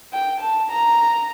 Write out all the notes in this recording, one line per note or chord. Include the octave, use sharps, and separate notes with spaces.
G5
A5
A#5